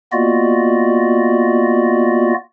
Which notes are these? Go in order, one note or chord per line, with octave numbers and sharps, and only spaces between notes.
A#3 B3 F4 F#4 D5 D#5